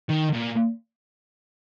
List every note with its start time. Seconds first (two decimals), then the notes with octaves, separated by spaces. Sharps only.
0.09 D#3
0.33 A#2